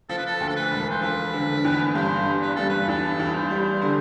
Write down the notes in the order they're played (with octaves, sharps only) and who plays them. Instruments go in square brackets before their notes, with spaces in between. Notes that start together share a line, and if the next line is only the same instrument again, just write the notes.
[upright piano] F3 [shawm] A4
[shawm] B4
A4
[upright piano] D2
[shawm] A4
B4
[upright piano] E1
[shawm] C5
[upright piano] F3 [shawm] B4
[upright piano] D3
E2
[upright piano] G2 [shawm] C5
[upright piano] G3
[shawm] B4
[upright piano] G2 [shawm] A4
[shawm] B4
[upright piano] E2 [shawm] A4
[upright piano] E2
[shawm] C5
[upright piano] G3
D3